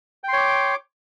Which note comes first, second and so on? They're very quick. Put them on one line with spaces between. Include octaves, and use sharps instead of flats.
G5 C6 C#5 D6